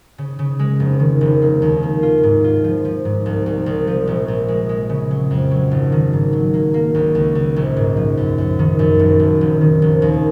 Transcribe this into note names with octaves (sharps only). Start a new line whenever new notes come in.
C#3
C#3
G#3
F1
D#3
F1
A#3
D#2
A#3
F4
G#2
F4
F3
F3
G#2
C2
C2
C2
F3
A#1
A#1
G#3
G#3
C#3
F#3
F2
F#3
G#1
D#3
G#2
F#3
A#3
A#3
C#2
C#2
C#2
A#1
G#2
F3
F#2
F#2
D#3
F#2
F#1
F#1
F1
D#3
F1
D#2